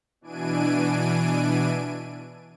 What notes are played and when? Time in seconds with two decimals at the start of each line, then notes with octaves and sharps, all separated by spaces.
0.21 B2 E3 D4 G#5 D7 D#7